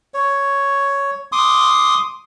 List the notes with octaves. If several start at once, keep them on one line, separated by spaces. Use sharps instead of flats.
C#5
C6 D6 D#6